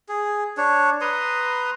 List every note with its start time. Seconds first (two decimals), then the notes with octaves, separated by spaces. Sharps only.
0.09 G#4
0.57 D4 C#5
1.01 B4 A#5 C6 D#6